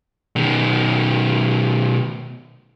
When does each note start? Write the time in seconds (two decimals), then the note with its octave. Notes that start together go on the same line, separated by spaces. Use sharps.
0.36 B2 D#3